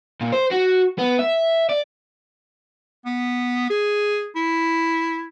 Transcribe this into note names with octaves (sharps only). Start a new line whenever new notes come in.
A#2
C5
F#4
B3
E5
D5
B3
G#4
E4